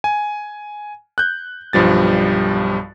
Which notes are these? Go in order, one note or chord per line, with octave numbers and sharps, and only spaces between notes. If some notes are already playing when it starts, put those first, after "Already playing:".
G#5
F#6 G6
B1 G2 F3 G3 A6